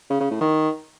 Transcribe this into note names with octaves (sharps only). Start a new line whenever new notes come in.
C#3
C#3
A2
D#3